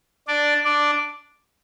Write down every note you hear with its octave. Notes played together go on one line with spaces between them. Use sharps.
D4 D5
D4 D5